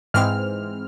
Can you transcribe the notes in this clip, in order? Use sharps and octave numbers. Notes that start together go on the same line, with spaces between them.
G#2 E3 G#3 C4 F6